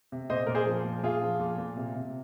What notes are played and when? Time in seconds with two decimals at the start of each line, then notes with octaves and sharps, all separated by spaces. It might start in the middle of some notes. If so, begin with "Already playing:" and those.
0.12 C3
0.30 A#2 C5 D#5
0.47 A#2 A#4
0.55 G#4 C5
0.66 F3
0.84 A#2
1.03 A#2 F4 G#4
1.22 F3
1.40 A#2
1.58 A#2
1.77 C3
1.95 C3